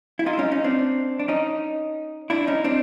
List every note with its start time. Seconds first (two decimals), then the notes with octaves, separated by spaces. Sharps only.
0.19 E4
0.26 D#4 F4
0.33 E4
0.39 C#4 D#4
0.52 C#4 D#4
0.64 C4 D4
1.19 D4
1.28 C#4 D#4
2.30 D4 E4
2.47 C#4 D#4
2.64 C4 D4